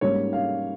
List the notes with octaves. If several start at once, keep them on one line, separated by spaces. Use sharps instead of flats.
G#2 G3 A#3 C#4 C#5
F5